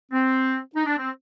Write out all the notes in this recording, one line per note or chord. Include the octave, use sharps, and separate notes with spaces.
C4
D#4
D4
C4